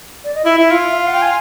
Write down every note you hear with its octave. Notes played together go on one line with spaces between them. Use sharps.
D5
D#5
E4 E5
E4
F4
E5
F5
F#5
G5
G#5